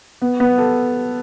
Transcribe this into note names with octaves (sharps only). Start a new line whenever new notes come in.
B3
B3
A4